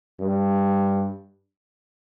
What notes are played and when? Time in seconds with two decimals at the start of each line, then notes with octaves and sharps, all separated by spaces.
0.20 G2